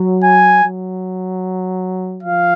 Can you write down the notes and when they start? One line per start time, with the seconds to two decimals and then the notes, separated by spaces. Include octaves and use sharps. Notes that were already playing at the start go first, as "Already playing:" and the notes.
Already playing: F#3
0.24 G#5
0.64 F#3
2.23 F3 F5